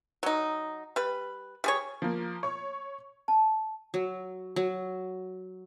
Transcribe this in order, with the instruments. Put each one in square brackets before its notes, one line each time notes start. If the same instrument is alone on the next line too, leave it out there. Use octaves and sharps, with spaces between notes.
[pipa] F#3 D#4
G3 B4
G3 G#4 C#5
[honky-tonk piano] F3 A#3
C#5 C#6
[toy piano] A5
[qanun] F#3
F#3